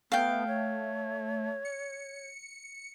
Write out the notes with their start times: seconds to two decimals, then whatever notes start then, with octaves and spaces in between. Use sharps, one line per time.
0.12 A3 B3 F5 G5
0.48 C#5
1.65 C#7